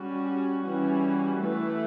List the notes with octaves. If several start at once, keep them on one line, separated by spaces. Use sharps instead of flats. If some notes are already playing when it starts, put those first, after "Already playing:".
Already playing: G3 C#4 F#4
E3 G3 C#4 F#4
E3 A3 E4 B4